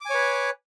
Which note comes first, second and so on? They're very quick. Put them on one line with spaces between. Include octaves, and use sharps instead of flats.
D6 G#5 C#5 B4